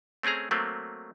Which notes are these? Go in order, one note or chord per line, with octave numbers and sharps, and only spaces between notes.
A3 C4 C#4 G#4 A#5
F#3 A3 A#3 C4